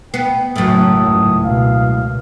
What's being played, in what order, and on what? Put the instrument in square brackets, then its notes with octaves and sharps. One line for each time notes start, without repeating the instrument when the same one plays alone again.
[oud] B3 [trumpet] G5
[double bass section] F#1 F#3 [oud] F#2 A2 [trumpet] D#6
[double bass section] C#2 [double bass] G#2
[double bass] B2 [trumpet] F5